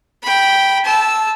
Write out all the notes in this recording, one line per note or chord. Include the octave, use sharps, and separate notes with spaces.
G5 B5
A5 E6